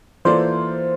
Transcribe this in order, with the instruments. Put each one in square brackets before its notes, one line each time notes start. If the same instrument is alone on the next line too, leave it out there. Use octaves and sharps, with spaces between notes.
[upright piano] E3 A#3 F4 A4 D5 [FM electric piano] C5